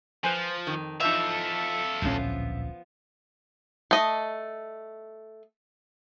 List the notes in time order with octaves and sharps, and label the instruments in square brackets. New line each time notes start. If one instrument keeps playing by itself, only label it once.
[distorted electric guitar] F3 [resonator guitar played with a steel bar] B4 C5 G#5
[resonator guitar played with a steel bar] F2 D#3
[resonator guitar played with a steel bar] E3 F3 D#4 [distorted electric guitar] A4 F5 [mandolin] E5
[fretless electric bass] D1 A#1 C#4 [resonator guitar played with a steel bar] F3 B3 F4
[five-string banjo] A3 D#5